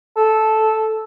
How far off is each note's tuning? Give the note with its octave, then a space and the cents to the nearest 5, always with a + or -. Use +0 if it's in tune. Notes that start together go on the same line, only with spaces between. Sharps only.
A4 -10